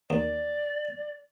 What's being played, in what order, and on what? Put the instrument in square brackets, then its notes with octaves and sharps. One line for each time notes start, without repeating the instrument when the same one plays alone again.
[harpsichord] D#2 [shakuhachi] D5